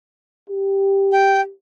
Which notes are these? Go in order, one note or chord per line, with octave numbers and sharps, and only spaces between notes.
G4
G5